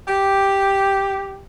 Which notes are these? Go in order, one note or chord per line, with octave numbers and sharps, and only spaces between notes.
G4